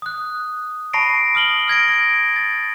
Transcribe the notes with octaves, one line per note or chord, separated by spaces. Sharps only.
D#6 F#6
A5 B5 C#6 A#6 C7 D7
D#6 F6 F#7 G7
F6 G#6 A#6 D7
A6